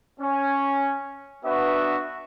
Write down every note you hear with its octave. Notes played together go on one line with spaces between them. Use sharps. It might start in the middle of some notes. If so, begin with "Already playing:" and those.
C#4
B3 D4 F#4 B4 E5